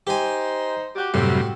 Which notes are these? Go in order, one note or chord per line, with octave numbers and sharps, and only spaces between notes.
D#4 G4 C5 G#5
F#4 G4
F#2 A2 C3 G3 C4 F#4 G4